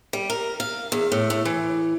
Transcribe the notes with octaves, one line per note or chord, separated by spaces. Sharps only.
G3
A#4
F5
E2
A2
A2
E3